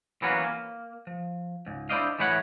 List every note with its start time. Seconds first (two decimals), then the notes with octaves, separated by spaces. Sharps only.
0.22 E3 F#3 A#3 B3 C#4 F#4
0.44 A#3
1.07 F3
1.66 C#2 G#2
1.89 D4 E4 C5 D5 D#5 F5
2.19 A2 E3 G#3 E4 C#5 F#5